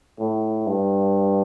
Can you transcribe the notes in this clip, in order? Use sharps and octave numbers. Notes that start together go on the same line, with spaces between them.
A2
G2